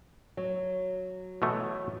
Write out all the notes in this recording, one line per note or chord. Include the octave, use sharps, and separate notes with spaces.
F#3
B2 E3 A3